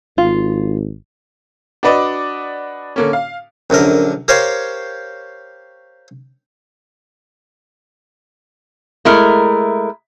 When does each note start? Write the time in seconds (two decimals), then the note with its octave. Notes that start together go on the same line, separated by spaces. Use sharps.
0.18 G#1 F4
1.83 D4 F#4 B4 D5 D#5
2.96 D3 A#3 C#4
3.13 F5
3.70 A#1 F#2 D3 A#4
4.28 G4 A#4 C5 C#5 F5 G5
9.05 G#3 A3 E4 A#4